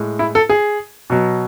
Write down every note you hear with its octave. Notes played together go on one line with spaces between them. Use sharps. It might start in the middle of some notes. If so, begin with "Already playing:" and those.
Already playing: A2 G#3
E4
A4
G#4
B2 F#3